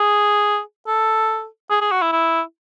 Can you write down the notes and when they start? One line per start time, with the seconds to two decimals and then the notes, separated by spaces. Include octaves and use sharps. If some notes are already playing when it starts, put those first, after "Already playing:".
Already playing: G#4
0.87 A4
1.70 G#4
1.81 G#4
1.91 F#4
2.02 E4
2.12 E4